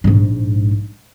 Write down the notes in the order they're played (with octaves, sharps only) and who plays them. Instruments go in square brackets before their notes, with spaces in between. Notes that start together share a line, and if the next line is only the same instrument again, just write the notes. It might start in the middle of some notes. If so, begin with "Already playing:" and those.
[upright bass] A#1 G#2